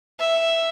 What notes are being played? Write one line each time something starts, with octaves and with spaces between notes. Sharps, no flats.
E5